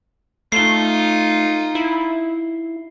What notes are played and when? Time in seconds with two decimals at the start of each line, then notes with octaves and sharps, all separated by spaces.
0.52 A3 D#4 F4 C7 G7
1.75 E4